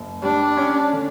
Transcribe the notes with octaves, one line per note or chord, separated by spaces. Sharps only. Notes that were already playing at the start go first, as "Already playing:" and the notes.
Already playing: F#1
G3 D4
C#4
D3